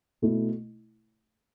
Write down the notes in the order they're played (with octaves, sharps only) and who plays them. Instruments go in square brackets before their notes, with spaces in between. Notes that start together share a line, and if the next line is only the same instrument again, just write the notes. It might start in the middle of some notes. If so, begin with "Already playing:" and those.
[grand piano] B2 A3 E4